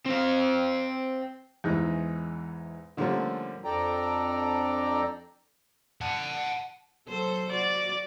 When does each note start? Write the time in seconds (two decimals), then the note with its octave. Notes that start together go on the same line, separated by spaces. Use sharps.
0.06 C4 F5
1.64 E2 G#2 E3 G#3
2.97 D3 F3 G3 A3 A#3 C#4
3.65 F2 D4 A4 D5 G5 A#5
6.01 F#5 A5
7.08 F#3 A4 C5
7.51 F#4 D5